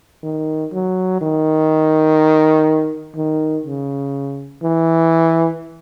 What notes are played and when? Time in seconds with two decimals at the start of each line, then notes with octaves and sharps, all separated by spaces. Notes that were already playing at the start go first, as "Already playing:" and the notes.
0.23 D#3
0.72 F#3
1.21 D#3
3.16 D#3
3.65 C#3
4.63 E3